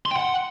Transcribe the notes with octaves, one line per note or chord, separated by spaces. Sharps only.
C6
G5
F#5